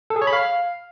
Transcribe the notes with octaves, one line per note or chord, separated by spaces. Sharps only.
A4
G#4
C#5
B5
F5